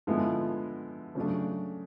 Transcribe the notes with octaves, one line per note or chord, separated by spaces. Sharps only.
D3 F3 G#3 B3 E4
C#3 F#3 A3 D4